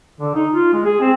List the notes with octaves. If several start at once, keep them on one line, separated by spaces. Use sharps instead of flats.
D3
D#4
F4
G#3
G#4
C4